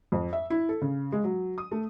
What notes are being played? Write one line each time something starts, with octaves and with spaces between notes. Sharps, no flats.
F2
E5
E4
A4
C#3
G#3
F#3
D#6
A3